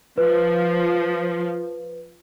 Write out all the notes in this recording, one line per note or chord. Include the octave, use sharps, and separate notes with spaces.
F3 B4